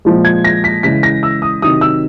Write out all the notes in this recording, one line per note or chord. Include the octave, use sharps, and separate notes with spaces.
A#2 F3 G#3
G#6
A#6
B6
C#3 E3 G#3 B6
A#6
E6
D#6
C3 D#3 F#3 D#6
E6